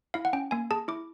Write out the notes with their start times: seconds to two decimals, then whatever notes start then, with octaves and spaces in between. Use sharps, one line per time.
0.14 E4 F5
0.25 F#5
0.33 C#4 G5
0.51 A#3 G#5
0.71 G#4 A5
0.88 E4 D6